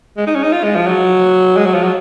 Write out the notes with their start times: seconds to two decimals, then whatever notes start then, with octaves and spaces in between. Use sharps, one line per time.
0.17 G#3
0.27 D#4
0.35 C#4
0.43 D#4
0.53 F4
0.64 G#3
0.76 F3
0.87 F#3
1.57 G#3
1.66 F#3
1.75 F3
1.83 F#3